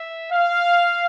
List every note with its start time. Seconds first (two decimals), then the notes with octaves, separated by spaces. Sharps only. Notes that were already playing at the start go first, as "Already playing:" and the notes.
Already playing: E5
0.32 F5